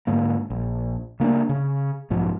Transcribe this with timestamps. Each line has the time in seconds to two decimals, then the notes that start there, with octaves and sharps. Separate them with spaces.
0.07 G#2 D3 A#3
0.50 A#1
1.20 C#3 A#3 C#4 D4
1.49 C#3
2.10 B1 G#2 F3